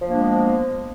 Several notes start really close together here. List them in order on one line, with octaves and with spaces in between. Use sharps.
F3 A#3 D4 G#3 B3